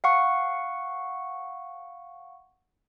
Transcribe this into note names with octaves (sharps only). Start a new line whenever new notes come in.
F5 F#5 C#6